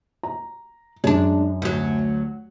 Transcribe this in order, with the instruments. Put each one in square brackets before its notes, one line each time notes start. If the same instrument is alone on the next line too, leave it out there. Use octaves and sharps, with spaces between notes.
[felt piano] A#5
[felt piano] F#2 [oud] G#3 D4
[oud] D2 F#3